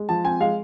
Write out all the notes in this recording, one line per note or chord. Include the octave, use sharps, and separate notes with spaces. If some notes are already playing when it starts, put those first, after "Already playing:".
Already playing: G#3
F3 A5
C4 G#5
G#3 F5